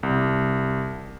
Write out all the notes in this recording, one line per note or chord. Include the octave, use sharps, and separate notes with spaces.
C2